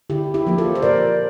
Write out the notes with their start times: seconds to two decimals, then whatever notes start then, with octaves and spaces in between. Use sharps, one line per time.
0.10 D3 E4 G4
0.34 E4 G4
0.47 F3 A#3
0.58 F4 A4
0.75 C5
0.82 A#2 A#4 D5